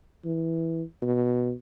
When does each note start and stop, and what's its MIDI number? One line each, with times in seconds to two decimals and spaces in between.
0.25 0.83 52
1.02 1.53 47